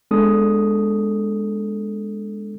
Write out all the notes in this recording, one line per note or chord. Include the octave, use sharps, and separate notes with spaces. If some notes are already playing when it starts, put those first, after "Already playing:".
G#3 B3 D4 A4 D#6